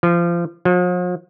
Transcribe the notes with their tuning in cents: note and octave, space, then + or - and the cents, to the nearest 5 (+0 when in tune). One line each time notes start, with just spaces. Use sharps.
F3 -25
F3 +45